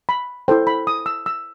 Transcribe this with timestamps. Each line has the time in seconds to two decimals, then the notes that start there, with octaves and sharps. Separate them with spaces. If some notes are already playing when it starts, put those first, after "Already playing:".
0.09 B5
0.48 E4 A4 C5 G5
0.67 B5
0.87 D#6
1.06 E6
1.26 E6